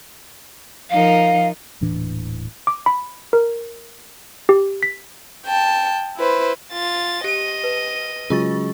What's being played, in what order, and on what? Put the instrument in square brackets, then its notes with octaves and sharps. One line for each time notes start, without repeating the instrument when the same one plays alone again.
[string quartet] F3 D#4 A#4 [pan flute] F5
[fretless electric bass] D#1 A2 E3 D4
[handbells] D6
B5
A#4
G4
B6
[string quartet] G5 A5
E4 B4 C5
[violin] F4 A6
[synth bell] G4 [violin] D#5 D#7
[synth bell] B4
[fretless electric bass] C#3 F#3 G#3 [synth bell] F4 C#6 A6